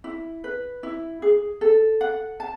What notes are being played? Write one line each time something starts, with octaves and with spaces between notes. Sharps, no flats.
E4
B4
E4
G#4
A4
F#5
A5